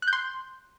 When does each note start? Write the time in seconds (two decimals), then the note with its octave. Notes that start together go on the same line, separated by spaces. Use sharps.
0.02 F#6
0.08 G6
0.13 C6